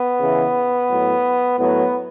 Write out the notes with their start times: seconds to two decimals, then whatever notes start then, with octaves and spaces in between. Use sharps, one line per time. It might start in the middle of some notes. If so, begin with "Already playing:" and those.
Already playing: B3
0.20 C#3 E3
0.90 A2 F#3
1.59 A2 F#3 B3